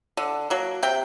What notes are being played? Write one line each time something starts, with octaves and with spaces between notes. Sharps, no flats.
D3
F#3 A#3
C3 G5